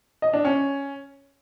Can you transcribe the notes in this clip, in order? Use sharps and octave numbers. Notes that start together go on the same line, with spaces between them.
D#5
D4
C#4